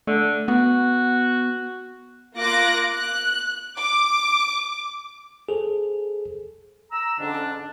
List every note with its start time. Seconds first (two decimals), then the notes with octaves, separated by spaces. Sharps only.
0.07 D3 A3
0.48 B3 F#4
2.36 A#3 F4 D6 F#6 A#6
2.90 F#6
3.77 D6
5.49 G#4 A4 C5
6.92 A#5 E6
7.19 F2 G#2 D3 C#4 D4